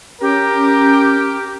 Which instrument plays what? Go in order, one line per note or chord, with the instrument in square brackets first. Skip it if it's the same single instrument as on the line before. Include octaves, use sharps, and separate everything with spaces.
[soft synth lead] C#4 [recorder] G4 [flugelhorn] A#4